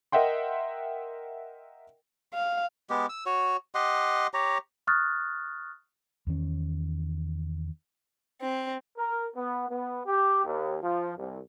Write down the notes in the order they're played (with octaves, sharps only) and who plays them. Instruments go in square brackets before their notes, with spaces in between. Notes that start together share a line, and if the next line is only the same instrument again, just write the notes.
[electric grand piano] A#4 D#5 E5 F#5 G5 C6
[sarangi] F5
[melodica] G#3 B3 G4
E6
F#4 C#5
G4 D#5 F#5 C6
G4 C#5 A#5
[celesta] C#6 D#6 F6 F#6 A6
[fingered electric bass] E2 D#3 C#4
[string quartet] C4
[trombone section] A#4
B3
B3
G4
D#2
F3
C2